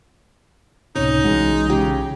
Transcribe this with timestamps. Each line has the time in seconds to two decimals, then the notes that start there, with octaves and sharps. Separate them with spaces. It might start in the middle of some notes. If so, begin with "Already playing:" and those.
0.96 C#2 A2 C3 C#4 D#4
1.24 B1 E3 G#3 F#4
1.70 C#3 G4 G#4